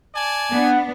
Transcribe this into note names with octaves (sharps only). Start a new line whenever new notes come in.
D5 G#5 A5
B3 D4 F#5